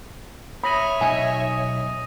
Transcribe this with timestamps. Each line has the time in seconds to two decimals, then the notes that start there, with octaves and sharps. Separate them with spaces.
0.64 C#5 E5 B5 D#6 A#6 D#7
1.01 B1 D#4 D#5 G#5